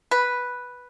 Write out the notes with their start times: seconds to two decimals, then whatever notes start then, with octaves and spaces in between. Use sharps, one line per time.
0.11 B4